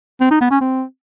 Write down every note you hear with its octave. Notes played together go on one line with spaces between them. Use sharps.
C4
D#4
B3
C#4
C4